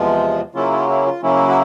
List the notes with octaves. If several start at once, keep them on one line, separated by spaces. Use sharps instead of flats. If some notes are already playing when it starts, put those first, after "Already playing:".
Already playing: E2 C3 F3 G#3 F4
C#3 F#3 A#3 C#4 E4 F4
F4
E4
F4
C#3 F#3 A#3 C#4 E4
F#4